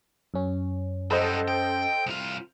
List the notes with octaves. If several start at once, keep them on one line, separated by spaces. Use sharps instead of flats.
F#2 C#4
F#3 G3 A4 C5 D#5
G5
C2 F4